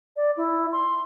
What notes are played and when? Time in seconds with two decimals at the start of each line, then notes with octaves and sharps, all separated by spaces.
0.16 D5
0.37 E4
0.72 C6